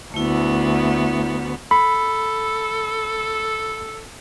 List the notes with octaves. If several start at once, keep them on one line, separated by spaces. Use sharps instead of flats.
D2 A3 B3 E4
A4 B5